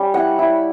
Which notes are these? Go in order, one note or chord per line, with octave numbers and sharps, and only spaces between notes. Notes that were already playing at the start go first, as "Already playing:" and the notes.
Already playing: G3 C#4
E4 F#5
E4